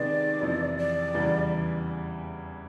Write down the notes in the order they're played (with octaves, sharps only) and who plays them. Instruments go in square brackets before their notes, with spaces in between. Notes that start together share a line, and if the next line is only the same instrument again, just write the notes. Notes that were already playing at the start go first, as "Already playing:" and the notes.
Already playing: [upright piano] C3 D#3 G#3 B3 D#4 [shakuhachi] D5
[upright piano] F2 C3 E3
[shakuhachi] D5
[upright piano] E2 C#3 E3 G3